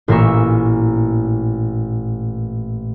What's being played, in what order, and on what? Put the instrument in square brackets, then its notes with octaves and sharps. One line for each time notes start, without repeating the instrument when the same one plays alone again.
[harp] A1 A#2 A#3 A#4 E5 C#6